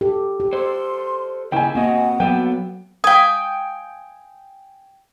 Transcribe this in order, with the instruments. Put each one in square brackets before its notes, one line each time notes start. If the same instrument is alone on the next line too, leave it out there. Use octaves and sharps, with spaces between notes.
[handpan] G4 A4
G4
[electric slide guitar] A4 C5 [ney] C6
[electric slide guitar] C#3 A#3 E4 [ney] D#5 [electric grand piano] G5 G#5
[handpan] A#3 [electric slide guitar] C4 F#4 D#5 [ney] F#5
[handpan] F#3 [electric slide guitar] B3 A4 B4 [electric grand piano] G5
[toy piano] F5 D#6 [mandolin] G5 G#5